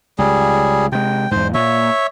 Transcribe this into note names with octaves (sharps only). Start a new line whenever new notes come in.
C#2 G3 G#4
C3 G#3 G5
E2 G#2 C5
A#2 C#5 E5